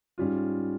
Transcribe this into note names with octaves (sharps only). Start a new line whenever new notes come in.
G#2 G3 C#4 F4